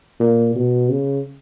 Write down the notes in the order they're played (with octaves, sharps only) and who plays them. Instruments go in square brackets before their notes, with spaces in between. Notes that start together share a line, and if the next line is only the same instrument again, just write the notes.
[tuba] A#2
B2
C#3